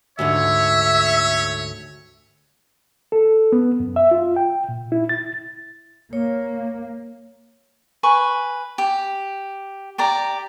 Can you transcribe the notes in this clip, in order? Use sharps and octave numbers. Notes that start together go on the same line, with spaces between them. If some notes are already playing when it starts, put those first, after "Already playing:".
D2 G#2 D3 C#5 E5
A4
B3
F#2
E5
F4
G5
A#2
E4
A6
A#3 C#5
B4 G#5 C#6
G4
G4 D5 A#5